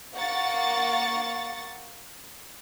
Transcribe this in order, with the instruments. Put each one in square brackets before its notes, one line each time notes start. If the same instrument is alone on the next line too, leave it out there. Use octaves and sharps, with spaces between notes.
[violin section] A#3 F#5 C#6 A6